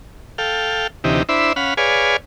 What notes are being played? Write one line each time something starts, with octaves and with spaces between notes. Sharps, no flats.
A4 F5 G5
D2 C3 E3 D#4 G4
D4 E4 C5 E5 B5
C#4 F5 F#5 B5
G#4 B4 C#5 D5 F5 G#5